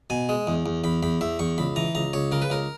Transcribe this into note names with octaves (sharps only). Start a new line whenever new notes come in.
B2 G#5
G#3
E2
E2
E2 B5
E2 B5
E2 E5
E2 C#6
C#2 B5
E3 A#5
C#2 A#5
C#2 C#5
C#3 A#4
B4
C#2 A#4